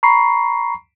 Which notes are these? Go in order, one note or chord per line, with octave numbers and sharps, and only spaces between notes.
A#5 B5 C#6 C7